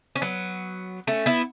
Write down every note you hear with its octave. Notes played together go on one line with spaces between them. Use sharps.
C#4
F#3 B3
A3 C#4
B3 E4